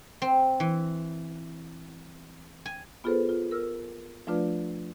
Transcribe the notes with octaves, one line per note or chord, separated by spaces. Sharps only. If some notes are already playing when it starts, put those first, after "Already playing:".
C4
E3
G#5
B3 F4 G#4 A4 B4 C5
F4
A#4 E6 F6
F3 A3 D4 F4 B4 D5